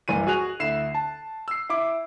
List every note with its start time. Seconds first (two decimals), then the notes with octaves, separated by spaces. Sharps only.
0.08 F#1 C2 E3 D#7
0.27 F#4 G#4 F#6 F7
0.60 D2 E4 C7 E7
0.94 A5
1.48 E6 C7
1.69 E4 D6